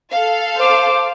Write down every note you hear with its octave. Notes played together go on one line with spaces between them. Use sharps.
A4 F5
C5 D6